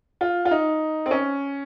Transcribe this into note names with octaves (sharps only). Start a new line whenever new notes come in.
F4
F4
D#4
C4
C#4